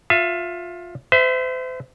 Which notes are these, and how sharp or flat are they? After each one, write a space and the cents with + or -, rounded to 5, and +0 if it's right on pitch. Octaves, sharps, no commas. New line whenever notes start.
F4 +20 E5 +30
C5 -40 E5 +5